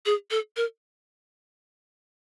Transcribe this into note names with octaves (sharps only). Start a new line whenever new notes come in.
G#4
A4
A#4